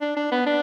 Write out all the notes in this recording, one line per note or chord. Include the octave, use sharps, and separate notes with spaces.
D4
D4
B3
D4